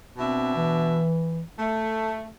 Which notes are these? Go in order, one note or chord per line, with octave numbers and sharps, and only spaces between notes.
B2 C4 D4 E5
E3
A3
A4